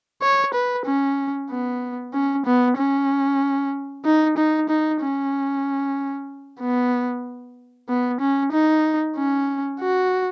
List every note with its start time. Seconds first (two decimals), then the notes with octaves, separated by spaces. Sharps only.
0.22 C#5
0.54 B4
0.86 C#4
1.50 B3
2.13 C#4
2.46 B3
2.77 C#4
4.05 D#4
4.37 D#4
4.69 D#4
5.02 C#4
6.61 B3
7.89 B3
8.21 C#4
8.52 D#4
9.16 C#4
9.80 F#4